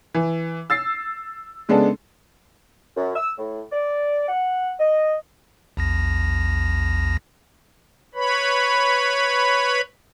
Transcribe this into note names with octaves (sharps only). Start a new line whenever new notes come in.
E3
E6 A6 C7
C#3 G#3 B3 D4 A4
F#2
E6
A2
D5
F#5
D#5
A#1 E2 A#6
B4 C#5 B5